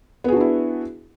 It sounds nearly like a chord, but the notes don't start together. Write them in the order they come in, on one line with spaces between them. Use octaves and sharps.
B3 G#4 F#4 D4 E4